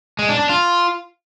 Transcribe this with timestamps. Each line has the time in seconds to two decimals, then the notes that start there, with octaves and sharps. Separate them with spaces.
0.19 G#3
0.29 D4
0.39 D4
0.49 F4